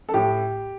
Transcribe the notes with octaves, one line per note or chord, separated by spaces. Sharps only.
A4
A2 G4